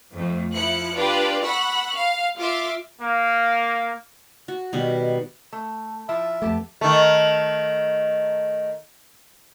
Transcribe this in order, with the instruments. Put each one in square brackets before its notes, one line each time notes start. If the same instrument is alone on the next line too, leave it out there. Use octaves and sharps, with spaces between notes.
[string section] F2 A3
F3 E4 F#6 C#7
D4 F4 G4 B4 D5
F#5 B5 C#6 E6 F#6
F5
F4 E5 C6 D6
[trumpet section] A#3 F5
[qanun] F#4
B2 D#3 G3
[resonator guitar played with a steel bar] A3
[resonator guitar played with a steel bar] F3 E4 F4 [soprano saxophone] E5
[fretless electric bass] F2 A3 [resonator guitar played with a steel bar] B3 G4 A5
[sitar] D#3 A3